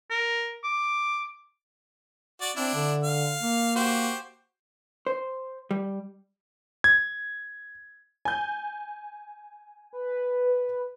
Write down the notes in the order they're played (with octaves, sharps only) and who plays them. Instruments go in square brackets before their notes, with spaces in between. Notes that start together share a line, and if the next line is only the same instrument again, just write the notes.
[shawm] A#4
D6
[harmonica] F#4 D5
[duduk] C4 [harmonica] D4 E4
[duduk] D3
[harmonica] F5
[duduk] A#3
[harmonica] F#4 G4 C5
[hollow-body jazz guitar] C5
G3
[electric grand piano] G#6
[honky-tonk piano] G#5 G6
[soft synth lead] B4